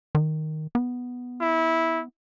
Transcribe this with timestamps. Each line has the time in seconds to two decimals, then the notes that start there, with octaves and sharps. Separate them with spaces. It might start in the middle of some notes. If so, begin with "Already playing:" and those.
0.15 D#3
0.75 B3
1.41 E4